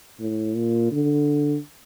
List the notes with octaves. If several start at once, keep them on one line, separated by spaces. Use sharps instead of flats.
A2
A#2
D3